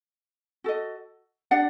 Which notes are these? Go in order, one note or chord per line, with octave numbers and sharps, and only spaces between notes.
F#4 A4 D#5
D4 G4 D5 F#5